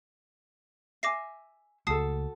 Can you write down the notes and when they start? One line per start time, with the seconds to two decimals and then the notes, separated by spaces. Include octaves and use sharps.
1.03 E5 G#5 D6 A#6 C7
1.87 C#2 A3 F#4 A4 A5 D#6 C7